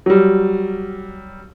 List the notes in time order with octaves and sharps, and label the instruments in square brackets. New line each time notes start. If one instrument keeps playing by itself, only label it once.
[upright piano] F#3 G3